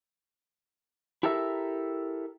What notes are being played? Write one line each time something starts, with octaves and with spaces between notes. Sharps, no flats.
E4 G4 A4 A#4 E5